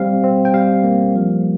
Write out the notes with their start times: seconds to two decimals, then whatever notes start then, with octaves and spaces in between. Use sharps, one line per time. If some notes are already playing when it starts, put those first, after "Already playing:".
Already playing: G3 C4 F5
0.24 C4
0.45 G5
0.54 G3 F5
0.84 A#3
1.15 F3